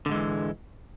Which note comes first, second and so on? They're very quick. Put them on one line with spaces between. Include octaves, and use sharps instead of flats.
D3 G#2 G#3 E3